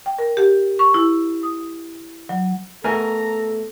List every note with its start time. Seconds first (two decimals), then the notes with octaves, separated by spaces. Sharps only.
0.06 G5
0.19 A#4
0.37 G4
0.79 C#6
0.94 E4
1.43 D#6
2.29 F#3
2.84 A3 B3 A4 A#4 E5 G#5 A#5